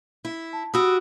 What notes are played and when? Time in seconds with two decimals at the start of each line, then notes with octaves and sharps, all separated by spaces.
0.25 E4
0.53 A5
0.74 F#4 G4 B5 D#6 E6